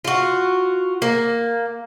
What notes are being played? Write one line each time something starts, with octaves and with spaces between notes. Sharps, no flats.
F4 F#4
A#3